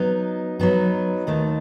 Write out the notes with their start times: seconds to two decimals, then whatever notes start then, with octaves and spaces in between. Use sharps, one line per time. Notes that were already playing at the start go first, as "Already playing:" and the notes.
Already playing: F#3 B3 D#4
0.59 F#3 B3 D#4
1.27 D#2 D#3 A3